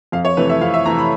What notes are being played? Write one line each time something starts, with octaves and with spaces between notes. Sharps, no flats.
F2 F5
C#5
C3 E3 A3 B4
E5
F2 F5
E5
C3 E3 A3 A#5
B5